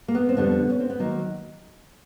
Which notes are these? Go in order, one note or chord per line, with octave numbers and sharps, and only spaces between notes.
A#3
B3
C4
F2 D3 G3 B3
C#4
C4
B3
D#3 F#3 A#3